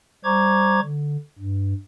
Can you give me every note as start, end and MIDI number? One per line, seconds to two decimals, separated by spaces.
0.24 0.80 55
0.24 0.80 72
0.24 0.80 82
0.24 0.80 85
0.24 0.80 86
0.24 0.80 92
0.81 1.17 50
1.38 1.73 43